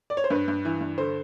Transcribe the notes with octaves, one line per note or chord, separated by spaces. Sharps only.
D5
C#5
C5
G2 B4
G2
E3
G2
D3 C5